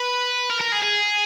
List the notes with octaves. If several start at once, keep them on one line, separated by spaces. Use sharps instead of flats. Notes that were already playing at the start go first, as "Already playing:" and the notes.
Already playing: B4
A#4
A#4
G#4
G#4